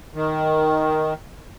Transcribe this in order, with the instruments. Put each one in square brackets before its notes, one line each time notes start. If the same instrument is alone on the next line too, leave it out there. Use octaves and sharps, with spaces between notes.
[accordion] D#3